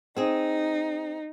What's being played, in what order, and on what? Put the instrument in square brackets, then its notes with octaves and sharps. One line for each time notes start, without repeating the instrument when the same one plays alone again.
[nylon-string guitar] C4 G#4 [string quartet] D#4